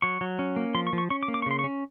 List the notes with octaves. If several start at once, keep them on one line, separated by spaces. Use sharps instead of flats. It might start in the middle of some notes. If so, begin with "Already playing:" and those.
F#3 C#6
F#3
C#4
A#3
F3 C6
C#6
F3
C#6
C#4 C#6
D6
A#3
D6
C#6
C#3 C6
C#6
C#4